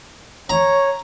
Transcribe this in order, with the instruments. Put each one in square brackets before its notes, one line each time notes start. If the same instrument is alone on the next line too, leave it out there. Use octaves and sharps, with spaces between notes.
[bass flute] C#5 [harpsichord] A#5